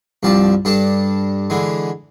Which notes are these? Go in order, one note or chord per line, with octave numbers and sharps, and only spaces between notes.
C2 G2 F3 D5 A5
G2 D4 A4 A5
D3 E3 G#3